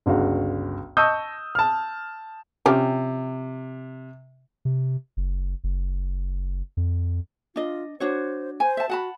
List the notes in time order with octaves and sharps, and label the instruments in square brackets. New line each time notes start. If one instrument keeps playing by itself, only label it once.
[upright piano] G1 C#2 F#4 F5
D#5 A5 C#6 D#6 E6 G6
A5 F6
[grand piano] C3 [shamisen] F3 C#4 G4
[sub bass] C3
F#1
F#1
F2
[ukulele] D4 D#5 [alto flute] F4
[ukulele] D4 F#4 C#5 [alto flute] C5
[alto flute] C5 [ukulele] G#5
[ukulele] E5 A5
[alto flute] F#4 [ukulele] F#5 A5 B5